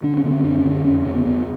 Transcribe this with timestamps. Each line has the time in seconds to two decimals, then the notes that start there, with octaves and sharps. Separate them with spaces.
0.03 D3 D4
0.17 C#4
0.24 D3 B3
0.31 C4
0.44 F#2 D4
0.58 C#4
0.64 D3
0.70 C#4
0.84 F2 C#4
1.05 C#3 C#4
1.15 B3
1.25 E2 B3